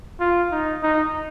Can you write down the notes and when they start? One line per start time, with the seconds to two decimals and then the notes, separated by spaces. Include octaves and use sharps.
0.20 F4
0.52 D#4
0.83 D#4